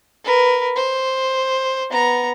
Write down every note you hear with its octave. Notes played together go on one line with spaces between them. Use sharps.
A#4 B4
C5
B3 A#5